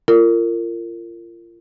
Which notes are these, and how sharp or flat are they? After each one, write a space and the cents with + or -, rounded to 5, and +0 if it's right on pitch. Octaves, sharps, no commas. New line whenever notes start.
F4 -30 A#4 -30